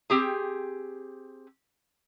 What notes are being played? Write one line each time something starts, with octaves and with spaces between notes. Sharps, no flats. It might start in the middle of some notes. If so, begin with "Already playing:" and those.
C4 G4 G#4